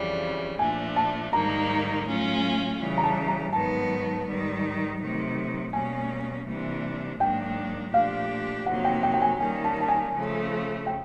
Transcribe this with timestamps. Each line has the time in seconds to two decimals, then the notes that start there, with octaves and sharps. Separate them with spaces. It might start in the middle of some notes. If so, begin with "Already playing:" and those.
Already playing: F2 C#3 E3 G3
0.59 A#2 F3 A3 D4 G#5
0.96 A5
1.33 G#2 D#3 G3 A#3 D#4 A#5
2.07 A2 F#3 A3 C#4 F4
2.80 C#3 E3 G3
2.98 A#5
3.03 A5
3.28 A#5
3.53 G#2 D#3 F#3 B3 A5
4.27 G#2 D#3 G3
4.99 C3 D#3 F#3 A3
5.73 B2 G3 A#3 C#4 G#5
6.47 C3 E3 G3 A#3 D4
7.19 G#2 D#3 F#3 A#3 D4 G5
7.93 A#2 F3 A3 D4 G4 F5
8.66 F2 C3 D#3 F#3 A#3 F#5
8.84 G5
9.03 G5
9.14 G5
9.22 G#5
9.40 D#3 G3 A#3 C#4 G#5
9.64 A5
9.81 A5
9.88 G#5
10.14 C#3 F3 A3
10.86 G5